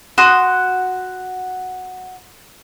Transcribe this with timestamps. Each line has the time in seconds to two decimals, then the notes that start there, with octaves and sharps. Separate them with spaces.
0.18 F#4 C6 D#6